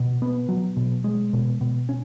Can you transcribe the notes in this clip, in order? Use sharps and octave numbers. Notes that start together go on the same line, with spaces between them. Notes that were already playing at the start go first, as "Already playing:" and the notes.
Already playing: B2
B3
F#3
B2
G#3
B2
B2
C#4